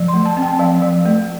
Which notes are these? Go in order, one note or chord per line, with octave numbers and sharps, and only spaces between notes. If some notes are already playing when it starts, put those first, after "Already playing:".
Already playing: F3
C6
A3
A5
C4
G5
F3 F5
F3
A3